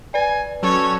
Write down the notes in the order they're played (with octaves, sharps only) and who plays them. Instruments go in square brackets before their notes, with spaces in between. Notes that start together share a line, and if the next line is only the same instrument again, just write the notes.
[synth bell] B4 D5 [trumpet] G#5
[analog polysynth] F#3 C#4 F#4 [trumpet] A4 [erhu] C#5